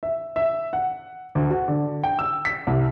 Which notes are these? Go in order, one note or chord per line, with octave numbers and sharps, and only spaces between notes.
E5
E5
F#5
D2
F#4
D3
G5
E6
B6
C2